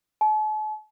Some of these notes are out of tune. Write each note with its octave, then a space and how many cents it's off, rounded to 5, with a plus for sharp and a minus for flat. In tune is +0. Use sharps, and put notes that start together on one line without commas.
A5 -45